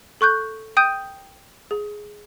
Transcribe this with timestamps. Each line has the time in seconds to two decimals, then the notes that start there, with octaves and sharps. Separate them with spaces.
0.21 A4 C#6 F#6 G6
0.77 G5 D#6 G6 D#7
1.71 G#4